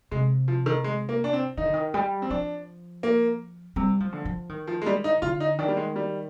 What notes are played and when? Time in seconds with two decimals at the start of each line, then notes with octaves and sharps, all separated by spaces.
0.11 C3 G#3
0.48 F3
0.66 D#3
0.84 G#3
1.09 A#3
1.24 D4
1.33 C4
1.57 D#3 D#4
1.65 D3
1.74 D#3
1.94 G3
2.22 C4
2.30 F3 D4
3.03 A#3
3.76 C3 G3
4.00 F3
4.13 D3
4.25 F3
4.49 D#3
4.67 F3
4.82 G#3
4.86 G3
5.04 D#4
5.22 D3 F4
5.40 D#4
5.59 D#3 D4
5.68 G3
5.77 G#3
5.96 G3